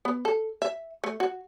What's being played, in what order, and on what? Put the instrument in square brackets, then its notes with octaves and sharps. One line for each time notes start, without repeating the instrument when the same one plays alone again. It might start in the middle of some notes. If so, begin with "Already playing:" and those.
[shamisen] B3
A4
E5
A3
F#4